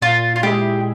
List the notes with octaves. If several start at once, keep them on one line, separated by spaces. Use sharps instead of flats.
A#2 F4
F4
G#3 E4 G4 G#4 E5